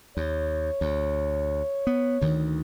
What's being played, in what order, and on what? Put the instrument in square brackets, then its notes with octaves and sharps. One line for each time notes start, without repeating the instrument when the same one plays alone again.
[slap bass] D#2 [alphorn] C#5
[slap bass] D2
B3
D2 D#3